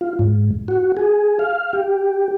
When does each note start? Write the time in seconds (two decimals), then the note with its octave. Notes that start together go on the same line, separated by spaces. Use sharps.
0.01 F4
0.19 G#2
0.68 F#4
0.97 G#4
1.39 F5
1.73 G4